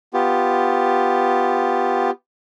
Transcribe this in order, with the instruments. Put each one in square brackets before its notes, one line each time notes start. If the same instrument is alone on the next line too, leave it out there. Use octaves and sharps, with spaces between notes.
[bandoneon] B3 F4 G4